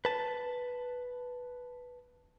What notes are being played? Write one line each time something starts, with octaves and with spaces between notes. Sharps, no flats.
B4 A5